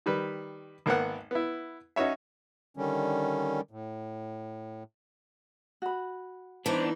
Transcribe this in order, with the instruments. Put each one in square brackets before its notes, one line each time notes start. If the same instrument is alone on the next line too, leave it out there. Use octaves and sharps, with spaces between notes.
[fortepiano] D#3 G3 B4
G#1 A#3 B3 F#5
B3 E4
C#4 D#4 F#4 C#5 E5
[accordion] D3 D#3 G3 C#4
A2
[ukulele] F#4 B5
[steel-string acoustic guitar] E3 D#4 [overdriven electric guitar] B3 D4 [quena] C5